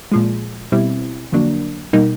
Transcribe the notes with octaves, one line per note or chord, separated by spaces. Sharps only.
A#2 F3 G#3
B2 G3 C4 E4
F2 D3 F#3 A#3 D4
B2 G3 A#3 D#4